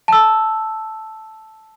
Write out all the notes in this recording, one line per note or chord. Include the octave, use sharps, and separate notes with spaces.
A5 E6